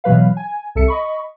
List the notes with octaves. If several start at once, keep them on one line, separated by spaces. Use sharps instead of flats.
B2 E3 F#3 B4 F5
G#5
C2 A4 E5 C#7
D#5 B5 C#6